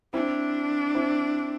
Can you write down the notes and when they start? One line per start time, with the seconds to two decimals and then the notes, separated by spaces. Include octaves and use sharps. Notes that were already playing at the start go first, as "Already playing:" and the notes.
0.14 C4 D4 E4
0.95 C4 E4